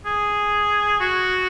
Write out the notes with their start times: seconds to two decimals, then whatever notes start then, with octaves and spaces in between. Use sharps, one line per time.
0.06 G#4
1.00 F#4